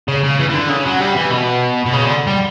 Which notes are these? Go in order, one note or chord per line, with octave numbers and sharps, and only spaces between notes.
C#3
C#3
E3
E3
D3
C#3
F#3
G3
E3
B2
B2
C#3
D3
G3